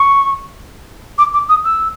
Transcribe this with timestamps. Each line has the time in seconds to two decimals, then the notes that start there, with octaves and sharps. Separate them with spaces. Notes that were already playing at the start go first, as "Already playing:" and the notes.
Already playing: C#6
1.18 D6
1.33 D6
1.49 D#6
1.64 E6